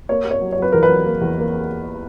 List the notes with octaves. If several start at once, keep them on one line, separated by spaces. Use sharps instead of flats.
A#3 C#5
A#3
C#5
F#3
C#5
F#3 B4
E2 A#4
B4
F#3
A#3
E2
A#3